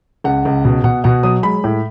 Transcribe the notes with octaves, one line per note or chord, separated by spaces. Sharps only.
C#2 F#5
C#2
B2
B2 F#5
B2 F#5
F#3 D#6
G#3 B5
A2